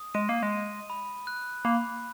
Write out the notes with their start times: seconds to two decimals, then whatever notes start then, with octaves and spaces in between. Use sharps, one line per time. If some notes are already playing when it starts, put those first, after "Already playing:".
Already playing: D#6
0.14 G#3 D#7
0.29 A#3
0.43 G#3
0.52 D#7
0.90 B5
1.27 F#6
1.65 A#3 B5